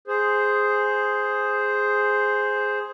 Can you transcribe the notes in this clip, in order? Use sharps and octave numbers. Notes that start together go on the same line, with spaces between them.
G#4 C5